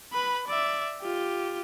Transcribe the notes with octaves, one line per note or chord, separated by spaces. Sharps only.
B4 B5
D5 E5
F4 G4